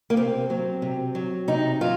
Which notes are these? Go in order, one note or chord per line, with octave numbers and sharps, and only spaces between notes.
A#3
C3 C4
F#3
C3
F#3
C3 D#4
F#3 F4